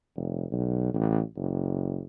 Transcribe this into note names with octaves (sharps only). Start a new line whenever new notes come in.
F1
B1
A1
F#1